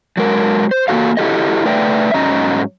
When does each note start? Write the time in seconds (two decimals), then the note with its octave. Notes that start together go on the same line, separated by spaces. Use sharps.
0.17 F#3 G#3 A#4
0.71 C5
0.88 A#3 C#4 F#4 A4 F5
1.17 E4 F#4 G4 A4 D#5
1.65 A3 B4 D5 E5 G5
2.14 G#2 F#3 C#4 D#5 A#5